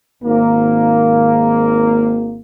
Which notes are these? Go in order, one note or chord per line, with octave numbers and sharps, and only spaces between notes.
G#1 A#3